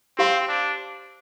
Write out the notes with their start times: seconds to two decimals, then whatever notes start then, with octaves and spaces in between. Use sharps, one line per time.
0.18 C4 G4 C5 F5 C6
0.48 D4